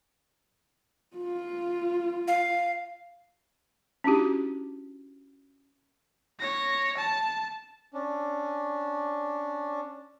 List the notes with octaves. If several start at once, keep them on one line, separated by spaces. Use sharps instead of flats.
F4
F5
C#4 D4 E4 F#4 G4
C#5 A#6
A5
C#4 D4